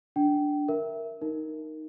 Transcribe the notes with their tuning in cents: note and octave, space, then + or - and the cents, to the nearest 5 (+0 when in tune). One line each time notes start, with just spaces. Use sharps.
D4 +0 G5 -25
A#4 +0 E5 +0
D#4 +0 A#4 +0